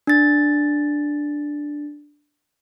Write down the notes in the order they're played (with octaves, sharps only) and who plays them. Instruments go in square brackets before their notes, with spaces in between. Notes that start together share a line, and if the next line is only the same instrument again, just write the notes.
[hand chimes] D4 A6